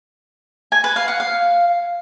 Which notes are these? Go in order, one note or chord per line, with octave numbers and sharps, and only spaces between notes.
G#5
B4
F5
F#5
F5